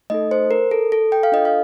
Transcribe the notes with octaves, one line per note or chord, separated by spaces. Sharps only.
A3 D#4 A4 D#5
C5
A#4
A4
A4
G5
F5
D4 F4 A4 D#5
F5